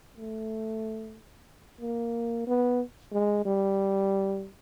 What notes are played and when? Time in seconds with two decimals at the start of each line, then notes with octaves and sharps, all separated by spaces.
0.17 A3
1.81 A#3
2.47 B3
3.12 G#3
3.45 G3